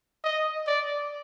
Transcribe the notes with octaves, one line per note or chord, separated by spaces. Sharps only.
D#5
D5